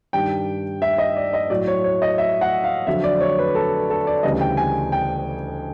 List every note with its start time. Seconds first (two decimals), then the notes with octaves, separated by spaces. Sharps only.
0.13 G2 D#3 G3 G5
0.82 E5
0.98 D#5
1.16 D5
1.34 D#5
1.50 A2 F#3 D5
1.67 C#5
1.84 C#5
2.02 D#5
2.18 E5
2.41 F#5
2.64 F5
2.87 F2 D3 F#3 E5
3.04 D5
3.21 C#5
3.39 B4
3.55 A4
3.90 A4
4.07 D5
4.23 D2 C#3 E3 G3 D#5
4.41 G5
4.57 G#5
4.92 G5